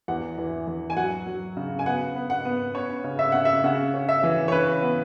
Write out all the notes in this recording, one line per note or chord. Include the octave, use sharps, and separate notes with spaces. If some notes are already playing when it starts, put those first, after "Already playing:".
E2 F#5
E3
E3
G#5
F#3 F#5
F#3
C#3
G#5
B3 F#5
B3
F#5
B3
C#4 C#5
C#3
E5
C#3 F#5
E5
C#3 F#5
C#4
E5
E3
C#5
C#3 B4
B3